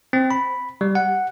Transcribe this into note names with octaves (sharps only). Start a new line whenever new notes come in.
C4
B5
G3
F#5